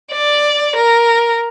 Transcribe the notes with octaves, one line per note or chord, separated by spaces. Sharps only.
D5
A#4